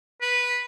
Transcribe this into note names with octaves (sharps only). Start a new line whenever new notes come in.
B4